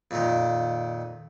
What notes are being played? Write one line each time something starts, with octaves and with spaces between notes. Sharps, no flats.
F2 A#2 D#3